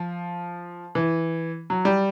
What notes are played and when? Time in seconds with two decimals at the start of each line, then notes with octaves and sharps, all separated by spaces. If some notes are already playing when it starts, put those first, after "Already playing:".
Already playing: F3
0.95 E3
1.70 F#3
1.85 G3